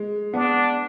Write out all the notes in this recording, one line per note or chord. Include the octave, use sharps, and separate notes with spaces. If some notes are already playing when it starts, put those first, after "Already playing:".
Already playing: G#3
B3 D4